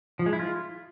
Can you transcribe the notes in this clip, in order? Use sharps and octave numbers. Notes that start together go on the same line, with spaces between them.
F3
G#3
E4
F4